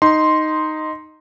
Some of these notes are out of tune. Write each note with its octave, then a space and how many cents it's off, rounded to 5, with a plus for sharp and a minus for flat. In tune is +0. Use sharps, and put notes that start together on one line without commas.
D#4 +0 C6 +0